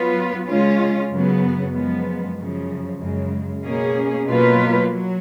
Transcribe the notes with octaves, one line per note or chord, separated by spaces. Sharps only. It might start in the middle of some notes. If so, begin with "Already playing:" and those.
Already playing: F#3 B3 F4 B4
C#3 G#3 C#4 F4
F#2 C#3 F#3 B3
F#2 F3 G#3 B3
F#2 C#3 F3
F#2 C#3 G#3
B2 A#3 C#4 G#4
B2 F#3 A#3 F4 B4
F#3